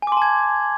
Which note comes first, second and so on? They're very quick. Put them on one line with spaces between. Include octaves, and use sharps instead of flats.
G#5 D6 C6 A5 G#6